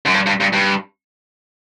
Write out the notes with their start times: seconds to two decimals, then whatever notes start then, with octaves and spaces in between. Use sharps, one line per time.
0.06 F#2
0.14 G2
0.27 G2
0.41 G2
0.53 G2